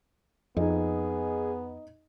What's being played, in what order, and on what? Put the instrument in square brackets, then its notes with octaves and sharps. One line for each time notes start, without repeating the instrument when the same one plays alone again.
[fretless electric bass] F2 [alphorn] B3 [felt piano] D#4 D#5 [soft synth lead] G#4